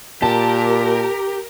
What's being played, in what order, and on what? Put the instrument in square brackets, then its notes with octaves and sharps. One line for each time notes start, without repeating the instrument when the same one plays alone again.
[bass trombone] A#2 [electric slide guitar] G4 [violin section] A#4 [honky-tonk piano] A5